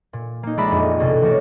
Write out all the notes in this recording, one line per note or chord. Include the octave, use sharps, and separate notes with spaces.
A#2
A#3 D#4
A#1 G#3 D5 E5 A#5 B5
F2 A#4 D#5
G1 C2 B2 A4
E3 A3 F#4 A#4 C#5 D5